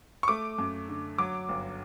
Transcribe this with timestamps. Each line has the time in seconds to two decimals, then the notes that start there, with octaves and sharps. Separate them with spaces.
0.23 C#6
0.28 A3 D6
0.58 F#2
0.89 D3
1.18 F#3 D6
1.49 G1